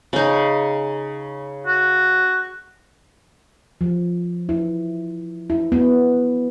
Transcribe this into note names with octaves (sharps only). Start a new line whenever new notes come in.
C#3 D#4
F#4
F3
E4
E4
B3